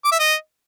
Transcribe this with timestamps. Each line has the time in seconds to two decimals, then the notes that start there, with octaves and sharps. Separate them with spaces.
0.04 D6
0.12 E5
0.19 D#5